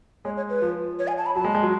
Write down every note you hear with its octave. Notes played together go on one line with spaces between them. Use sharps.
G#3 C#5
C#5
B4
F3
C#5
G#5
A5
B5
F#3 A5
G#3
G#3
F#3